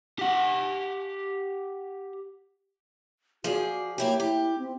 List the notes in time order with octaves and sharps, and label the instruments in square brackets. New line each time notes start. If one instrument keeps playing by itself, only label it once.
[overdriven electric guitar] G4 F#5
[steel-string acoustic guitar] F3 G#4 D5 [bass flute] F#4
[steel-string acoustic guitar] A#3 E4 G4 [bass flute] C#5
[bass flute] E4 [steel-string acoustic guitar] G4
[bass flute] C4